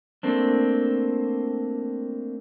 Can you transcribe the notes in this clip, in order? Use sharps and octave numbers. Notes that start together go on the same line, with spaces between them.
A3 A#3 C4 D4